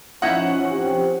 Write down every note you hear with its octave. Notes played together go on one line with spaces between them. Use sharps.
F3 C#4 D#4 E4 F#5
C4 G4